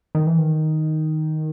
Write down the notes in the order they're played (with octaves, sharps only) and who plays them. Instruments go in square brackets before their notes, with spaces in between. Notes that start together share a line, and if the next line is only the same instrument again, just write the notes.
[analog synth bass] D#3
E3
D#3